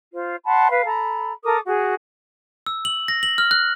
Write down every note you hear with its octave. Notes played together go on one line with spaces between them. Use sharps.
F4 C5
F#5 A5 B5 C6
B4 F5
A4 A#5 B5
A4 A#4 D6 D#6
F#4 G#4
E6
F#7
A#6
F#7
F6
F#6